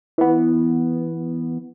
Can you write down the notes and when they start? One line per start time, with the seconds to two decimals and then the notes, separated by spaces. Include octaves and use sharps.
0.18 E3 B3